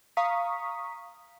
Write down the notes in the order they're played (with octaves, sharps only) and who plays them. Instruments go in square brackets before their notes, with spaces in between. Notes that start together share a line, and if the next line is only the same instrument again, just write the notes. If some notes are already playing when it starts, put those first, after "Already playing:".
[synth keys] F5 A#5 C#6 D#6 B6